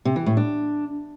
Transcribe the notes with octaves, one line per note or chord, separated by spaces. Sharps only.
C3
E3
A2
D4